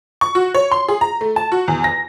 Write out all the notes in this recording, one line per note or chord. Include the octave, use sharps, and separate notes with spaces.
C#6
F#4
C#5
C6
G#4
A#5
A3
A5
F#4
E2
A#6